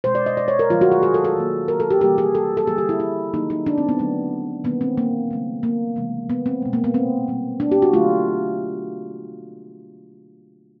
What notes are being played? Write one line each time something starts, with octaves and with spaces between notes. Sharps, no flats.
B2 G#3 C5
D5
D#5
D5
C#5
A#4
D#3 F#3 A3 F4
F#4
G#4
G#4
A4
A4
D#3 F#3 A#3
A#4
A4
G4
C3 E3 G3 A#3 G4
G#4
A4
A4
D3 G3 A#3 G#4
G4
E4
E4
D#3 F#3 A#3 D#4
D#4
D4
C4
B3
D3 F#3 A3 B3
D#3 G3 A#3 B3
C4
A#3
C#3 F#3 A3
A#3
C3 E3 G#3
B3
C4
B2 G#3
A#3
B3
C4
B2 G3 A#3
D4
G4
F#4
D3 F#3 A3 F4